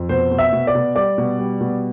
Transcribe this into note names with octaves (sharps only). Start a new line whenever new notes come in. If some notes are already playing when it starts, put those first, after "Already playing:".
Already playing: F2
B2 C5
B2
E5
B2
D5
B2
G3 D5
B2
G3
B2